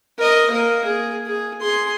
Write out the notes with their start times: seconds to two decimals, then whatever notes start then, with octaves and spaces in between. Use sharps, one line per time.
0.19 A#4 D#5
0.51 A#3 A#4
0.85 G#4
1.26 G#4
1.61 G#4 C6